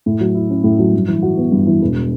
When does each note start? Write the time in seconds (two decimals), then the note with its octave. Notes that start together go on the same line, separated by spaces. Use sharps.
0.06 A2
0.20 F#3
0.35 E4
0.50 C#4
0.64 A2
0.79 F#3
0.93 G2
1.08 E3
1.22 F#4
1.38 B3
1.52 G2
1.67 E3
1.81 E1